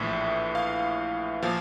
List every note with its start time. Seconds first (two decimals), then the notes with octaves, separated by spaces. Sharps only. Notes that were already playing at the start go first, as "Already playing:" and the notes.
Already playing: A#1 A2 E3 E5
0.55 F5
1.43 A#2 F3 F5